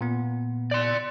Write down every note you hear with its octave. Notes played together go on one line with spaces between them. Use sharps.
A#2 B3
D5 C6